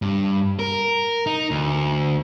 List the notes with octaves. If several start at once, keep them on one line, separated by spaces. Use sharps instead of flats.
G2
A#4
D#4
D2